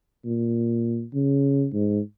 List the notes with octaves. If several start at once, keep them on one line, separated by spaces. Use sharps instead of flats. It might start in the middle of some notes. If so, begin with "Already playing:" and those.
A#2
C#3
G#2